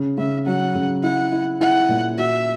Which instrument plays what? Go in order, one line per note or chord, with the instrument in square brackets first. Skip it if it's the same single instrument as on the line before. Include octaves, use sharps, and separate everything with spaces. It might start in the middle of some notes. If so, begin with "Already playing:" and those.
Already playing: [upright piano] C#3
[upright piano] C#3 [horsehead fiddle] E5
[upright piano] F#3 [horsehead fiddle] F#5
[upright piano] C#3
[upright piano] E4 [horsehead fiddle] F#5
[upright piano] E4
[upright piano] E4 [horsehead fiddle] F#5
[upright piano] A#2
[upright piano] F#4 [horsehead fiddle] E5